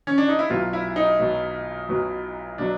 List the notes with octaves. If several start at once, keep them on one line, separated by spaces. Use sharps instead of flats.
C#4
D4
D#4
E4
B1 B2 F#3 F4
E4
D#4
B1 B2 F#3
B1 B2 F#3
B2 F#3 D4